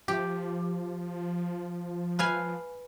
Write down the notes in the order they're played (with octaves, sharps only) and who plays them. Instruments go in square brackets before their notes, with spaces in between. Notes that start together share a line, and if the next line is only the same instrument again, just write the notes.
[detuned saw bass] F3 [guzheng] G4
[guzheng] B4 F5 G#5